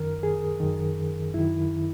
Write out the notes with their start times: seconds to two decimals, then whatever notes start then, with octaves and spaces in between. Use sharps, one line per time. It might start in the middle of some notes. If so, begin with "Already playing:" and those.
Already playing: F#2 D#3 A#4
0.23 G#4
0.60 F#2 D#3
1.34 F#2 D#3 E4